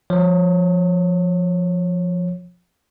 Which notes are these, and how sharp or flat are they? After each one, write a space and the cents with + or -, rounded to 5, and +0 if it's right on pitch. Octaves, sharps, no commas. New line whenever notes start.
F3 +0 C#5 -15